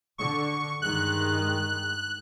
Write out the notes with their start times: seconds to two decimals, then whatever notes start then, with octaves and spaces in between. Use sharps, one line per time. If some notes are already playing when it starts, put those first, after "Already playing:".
0.18 D3 C#6
0.82 G2 D#3 G#3 F#6